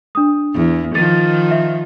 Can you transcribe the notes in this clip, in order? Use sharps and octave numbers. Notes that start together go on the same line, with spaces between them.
D4 D#6
E2
D#3 F3 A6 D#7
E5